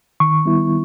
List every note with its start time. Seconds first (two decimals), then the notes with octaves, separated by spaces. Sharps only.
0.20 D#3 C#6
0.45 G3 B3 E4